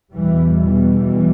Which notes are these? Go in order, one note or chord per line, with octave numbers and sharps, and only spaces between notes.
E2 B2 E3 G3
E3 G3